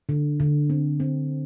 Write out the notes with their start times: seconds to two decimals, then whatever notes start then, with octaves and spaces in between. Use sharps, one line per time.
0.09 D3
0.40 D3
0.70 C4
1.00 C4